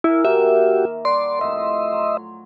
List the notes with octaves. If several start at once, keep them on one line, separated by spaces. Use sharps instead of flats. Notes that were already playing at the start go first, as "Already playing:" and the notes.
E4 A#4 F5 G#5
D#3 A#3 F#4 G4 E5 D6
G3 D5 F#5 C6
A2 C3 F3 D#5 E5
F#3